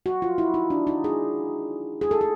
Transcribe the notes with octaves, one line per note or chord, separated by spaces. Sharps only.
F#4
F4
E4
D#4
D4
D#4
G#4
G#4
A4
G#4